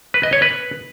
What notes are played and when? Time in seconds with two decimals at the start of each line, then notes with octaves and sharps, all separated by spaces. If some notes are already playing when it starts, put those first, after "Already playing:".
0.14 B4
0.23 D#5
0.33 C#5
0.42 B4